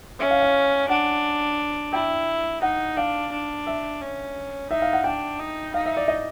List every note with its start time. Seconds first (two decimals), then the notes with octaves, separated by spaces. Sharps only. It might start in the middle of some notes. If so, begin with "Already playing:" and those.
0.19 C#4 E5
0.31 F5
0.42 F5
0.89 D4 F#5
1.93 E4 G5
2.62 D#4 F#5
2.97 D4 F5
3.32 D4
3.67 E5
4.01 C#4
4.70 D#4 E5
4.82 F5
4.93 F#5
5.04 D4 G5
5.39 D#4
5.74 D#4 F5
5.86 E5
5.97 D5
6.08 D#5